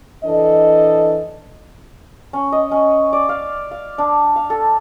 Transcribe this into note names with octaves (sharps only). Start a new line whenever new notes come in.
E3 D4 A4 D#5
C#4
D#5
C#4
D5
F5
F5
D4
F5
A4